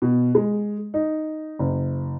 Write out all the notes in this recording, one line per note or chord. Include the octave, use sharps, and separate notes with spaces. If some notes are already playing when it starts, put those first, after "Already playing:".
B2
G#3
D#4
F#1